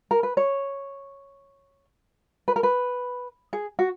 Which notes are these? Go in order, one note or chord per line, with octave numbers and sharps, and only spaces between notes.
A#4
B4
C#5
B4
A#4
B4
G#4
F#4